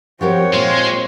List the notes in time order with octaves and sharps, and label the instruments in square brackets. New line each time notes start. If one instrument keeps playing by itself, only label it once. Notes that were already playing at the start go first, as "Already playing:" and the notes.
[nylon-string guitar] F3 G4 A#4 [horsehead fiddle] C4 C#5 [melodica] F#4
[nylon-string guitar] A#2 [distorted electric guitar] G#3 [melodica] F4